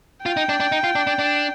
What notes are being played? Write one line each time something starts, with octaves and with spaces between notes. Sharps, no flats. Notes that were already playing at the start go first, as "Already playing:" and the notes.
F4 G5
D#4
D4
D4
D#4
F4
D4
D4
D4